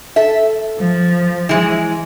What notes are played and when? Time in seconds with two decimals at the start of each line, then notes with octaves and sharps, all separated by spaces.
0.16 A4 E5
0.79 F3
1.49 E3 G#3